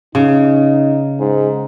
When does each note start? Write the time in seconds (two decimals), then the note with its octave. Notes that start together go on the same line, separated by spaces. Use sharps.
0.15 C#3 D#4
1.20 G#2